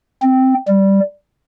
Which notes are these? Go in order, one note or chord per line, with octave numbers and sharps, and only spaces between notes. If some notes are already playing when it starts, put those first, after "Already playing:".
C4
G3